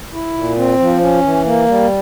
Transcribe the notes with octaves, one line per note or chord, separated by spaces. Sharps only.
E4
A#2
C4
F3
C#4
E3
A#3
G3